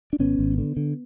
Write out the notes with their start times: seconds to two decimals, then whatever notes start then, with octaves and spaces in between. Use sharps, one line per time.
0.13 D4
0.19 G#1 B3 C#4
0.39 G#1
0.58 D3
0.77 D3